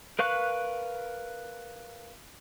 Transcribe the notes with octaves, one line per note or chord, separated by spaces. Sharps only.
A#4 B4 F5 C#6 F#6